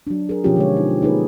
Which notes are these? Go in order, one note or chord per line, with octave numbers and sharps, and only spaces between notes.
F#3 D4
G#4 A#4
B2 F3 B3 C#4 F4 G4
D3 G#3 C#5
D#4
A#3 D#4 G#4 B4